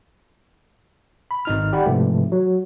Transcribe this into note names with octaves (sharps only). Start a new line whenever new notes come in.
B5
G#1 D#4 F6
G4 D5 F#5 B5
G#2 C3 E3 F3 A3
F#3